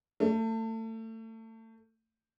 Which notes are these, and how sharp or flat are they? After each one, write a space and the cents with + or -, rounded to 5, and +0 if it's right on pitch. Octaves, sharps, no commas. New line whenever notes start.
A3 +30